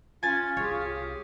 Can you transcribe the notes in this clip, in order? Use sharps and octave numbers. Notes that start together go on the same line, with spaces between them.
C#4 F4 G#5 A6
C2 G4 G#4 C#5